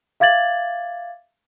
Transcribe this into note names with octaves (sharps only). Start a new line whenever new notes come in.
E5 F5 D6 G#6 A6 F#7